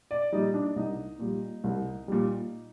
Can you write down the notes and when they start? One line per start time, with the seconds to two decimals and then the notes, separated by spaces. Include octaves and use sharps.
0.11 D5
0.32 A#2 G3 D#4
0.54 D4
0.76 C2 D#4
1.19 A#2 G3
1.64 C2
2.08 A#2 G3